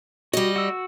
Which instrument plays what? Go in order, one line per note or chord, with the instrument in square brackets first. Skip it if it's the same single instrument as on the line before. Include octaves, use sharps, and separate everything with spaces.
[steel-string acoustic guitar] G3 D#5 [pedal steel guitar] F#4
[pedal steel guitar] F#4 E6